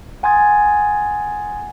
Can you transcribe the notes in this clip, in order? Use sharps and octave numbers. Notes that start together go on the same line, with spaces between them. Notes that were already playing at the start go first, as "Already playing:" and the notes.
F#5 G#5 C6 D#6 G#6 A6